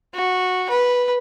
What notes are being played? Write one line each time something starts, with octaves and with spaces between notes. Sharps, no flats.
F#4
B4